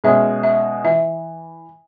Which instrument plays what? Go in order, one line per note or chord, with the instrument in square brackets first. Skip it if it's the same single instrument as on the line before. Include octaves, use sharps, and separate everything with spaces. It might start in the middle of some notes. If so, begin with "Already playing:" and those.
[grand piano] B2 G#3 C#4 G#4 [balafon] E5
[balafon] E5
[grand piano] E3 [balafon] E5